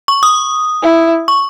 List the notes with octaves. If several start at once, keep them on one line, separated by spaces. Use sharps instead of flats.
C#6
D#6
E4
C#6